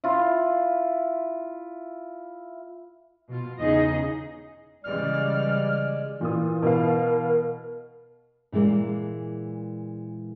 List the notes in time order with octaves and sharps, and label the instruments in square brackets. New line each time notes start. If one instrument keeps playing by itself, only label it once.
[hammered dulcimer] E4 F4
[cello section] B2 F4
E2 C#3 D#4 G#4 D#5
[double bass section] C#3 E3 G3 [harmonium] G#3 D5 [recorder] F6
[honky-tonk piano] A#2 D#6 [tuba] E3
[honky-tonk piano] B2 B3 F5 [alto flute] A#4
[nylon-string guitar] A#2 E3 G#3 A#3